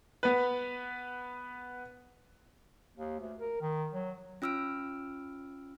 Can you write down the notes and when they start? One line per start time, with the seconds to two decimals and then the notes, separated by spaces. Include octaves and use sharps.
0.23 B3 B4
2.96 D#2
3.20 D2
3.39 A#4
3.61 D#3
3.93 F#3
4.42 C#4 F4 E6 F6 D7